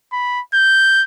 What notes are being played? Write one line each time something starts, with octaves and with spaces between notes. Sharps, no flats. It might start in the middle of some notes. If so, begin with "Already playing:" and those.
B5
G6